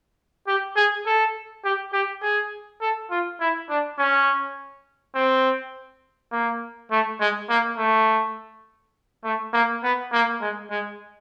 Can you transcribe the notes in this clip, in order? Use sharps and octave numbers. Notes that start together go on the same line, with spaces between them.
G4
G#4
A4
G4
G4
G#4
A4
F4
E4
D4
C#4
C4
A#3
A3
G#3
A#3
A3
A3
A#3
B3
A#3
G#3
G#3